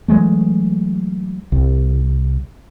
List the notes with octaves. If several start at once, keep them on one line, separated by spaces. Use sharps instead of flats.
E3 F#3 G#3 A3
C2